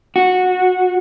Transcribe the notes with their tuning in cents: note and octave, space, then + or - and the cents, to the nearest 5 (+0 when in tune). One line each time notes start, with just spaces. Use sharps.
F#4 -15